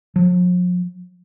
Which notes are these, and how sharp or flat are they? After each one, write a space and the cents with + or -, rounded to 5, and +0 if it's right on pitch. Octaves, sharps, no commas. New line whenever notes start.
F3 +45